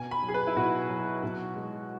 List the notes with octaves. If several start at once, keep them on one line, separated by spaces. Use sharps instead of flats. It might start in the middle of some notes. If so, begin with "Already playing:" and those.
Already playing: B2 G#5
B5
F#3
G#4
B4
E4
B2 F#4
F#3
B2
G#3